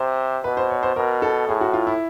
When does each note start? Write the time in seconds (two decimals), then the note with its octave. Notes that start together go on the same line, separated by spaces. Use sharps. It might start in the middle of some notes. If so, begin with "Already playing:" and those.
Already playing: C3 C5
0.44 B2 B4
0.57 C5
0.70 C#5
0.83 C5
0.96 B2 A#4
1.22 A4
1.48 A2 G#4
1.61 F#4
1.74 F4
1.87 E4